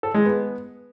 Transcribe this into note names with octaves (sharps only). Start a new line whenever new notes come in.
A4
G#3
B3